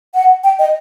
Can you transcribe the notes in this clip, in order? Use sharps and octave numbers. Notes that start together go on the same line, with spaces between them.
F#5
G5
D#5